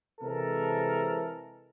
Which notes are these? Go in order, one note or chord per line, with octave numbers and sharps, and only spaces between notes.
C3 E3 G#3 A4 A#4